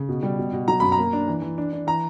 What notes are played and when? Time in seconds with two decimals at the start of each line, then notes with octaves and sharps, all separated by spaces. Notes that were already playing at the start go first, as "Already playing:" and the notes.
Already playing: C#3
0.09 B2
0.23 G3
0.38 B2
0.53 B2
0.68 F#3 A#5
0.80 F#2 B5
0.92 A#5
0.98 A#3
1.13 D4
1.28 E3
1.42 E3
1.58 D4
1.73 D4
1.87 E3 A#5